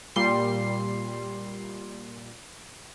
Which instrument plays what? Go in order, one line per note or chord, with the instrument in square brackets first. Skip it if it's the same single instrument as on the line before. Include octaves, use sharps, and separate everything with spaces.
[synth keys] A#2 G3 C6 C7